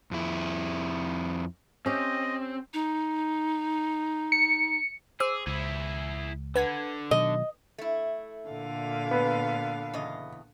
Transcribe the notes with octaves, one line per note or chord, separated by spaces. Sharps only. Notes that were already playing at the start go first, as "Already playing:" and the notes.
F2 E4
C4 C#4 G4 D#5
D#4
C#7
G#4 C5 D6 E6
C#2 E4 G#4
D3 B4 F#5 G#6
B2 D#3 F#3 D#5
A3 E4
A#2 D3 F5
B3
E2 C#3 D#5